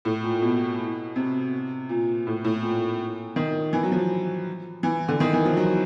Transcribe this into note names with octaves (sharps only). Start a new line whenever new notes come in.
A2
A#2
B2
C3
A#2
A2
A2
A#2
D#3
E3
F#3
F3
E3
D3
D#3
E3
F3
F#3